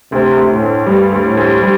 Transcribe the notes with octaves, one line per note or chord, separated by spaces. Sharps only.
D2 C3
D2
A2
D2
G2 G3
D2
A2
D2
G3